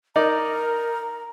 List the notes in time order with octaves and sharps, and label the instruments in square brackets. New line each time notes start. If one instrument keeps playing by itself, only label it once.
[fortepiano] D#4 D5 [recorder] A#4 [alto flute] A#5